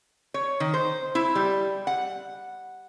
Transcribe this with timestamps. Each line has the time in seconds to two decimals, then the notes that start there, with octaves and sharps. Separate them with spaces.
0.34 C#5
0.60 D#3
0.74 C5
1.15 E4
1.35 G3
1.87 F#5